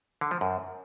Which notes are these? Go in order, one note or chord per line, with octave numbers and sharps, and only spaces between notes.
D3
F3
F#2